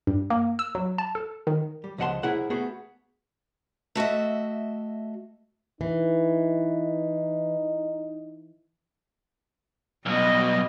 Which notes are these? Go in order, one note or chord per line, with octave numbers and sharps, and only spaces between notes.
G2
A#3
E6
F#3
A5
A4
D#3
G3
C#2 F3 D#5 F#5 A5 C6
C2 C3 E4 G#4 F#5
A3 B3 F#4 G#4
A3 F#4 D#5 E5
E3 D#4
B1 B2 G3 D#5